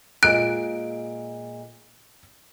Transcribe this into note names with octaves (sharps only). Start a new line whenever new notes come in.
A#2 G#3 F#6 D7